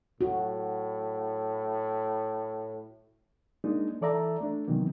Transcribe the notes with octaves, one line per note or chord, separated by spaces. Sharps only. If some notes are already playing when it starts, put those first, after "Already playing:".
A2 F#4
G#3 A#3 D4 D#4
E3 A4 D5 E5 A#5
A3 D4
C3 D#3 E3 F#3 A#3 B3